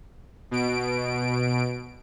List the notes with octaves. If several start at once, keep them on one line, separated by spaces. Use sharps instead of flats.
B2 D7